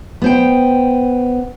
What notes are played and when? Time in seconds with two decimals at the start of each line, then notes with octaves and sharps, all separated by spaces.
0.22 B3 C5 G5